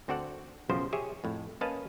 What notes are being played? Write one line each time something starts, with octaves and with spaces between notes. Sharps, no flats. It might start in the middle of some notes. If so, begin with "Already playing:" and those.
D2 C4 F#4 A4 D5 F#5
B1 F#2 C#3 F3 C5
G4 G#4 C#5 E5
F2 A2
A#3 C#4 B4 D#5 F5 A5